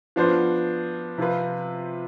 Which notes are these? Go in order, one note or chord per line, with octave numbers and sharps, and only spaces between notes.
F3 B3 D4 F4 C5
C3 F3 C4 F4 B4